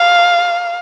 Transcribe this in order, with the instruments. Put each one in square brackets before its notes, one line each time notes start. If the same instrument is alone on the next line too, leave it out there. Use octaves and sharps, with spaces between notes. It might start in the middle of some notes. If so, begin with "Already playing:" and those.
Already playing: [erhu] F5